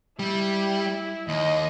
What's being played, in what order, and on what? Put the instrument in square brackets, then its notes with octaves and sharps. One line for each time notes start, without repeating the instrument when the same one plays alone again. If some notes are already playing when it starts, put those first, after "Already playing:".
[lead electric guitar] G3 [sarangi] E4
[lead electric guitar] D#2 [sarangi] D#5